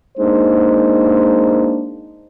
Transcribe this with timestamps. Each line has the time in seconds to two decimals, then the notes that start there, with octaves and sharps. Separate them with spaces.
0.18 G#3 A#3 D4 D#4 C5